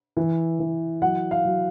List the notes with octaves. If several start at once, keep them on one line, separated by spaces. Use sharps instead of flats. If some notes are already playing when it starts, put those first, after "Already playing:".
E3
E3
F#3 F#5
F5
F#3